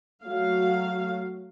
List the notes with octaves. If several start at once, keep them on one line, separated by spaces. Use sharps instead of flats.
F#3 A3 F#4 F5